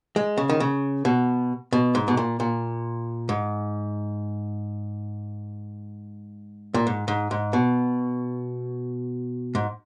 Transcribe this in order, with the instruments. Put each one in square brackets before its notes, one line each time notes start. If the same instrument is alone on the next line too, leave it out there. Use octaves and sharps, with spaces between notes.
[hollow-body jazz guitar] G#3
C#3
D#3
C#3
B2
B2
G#2
B2
A#2
A#2
G#2
A#2
G#2
G#2
G#2
B2
G#2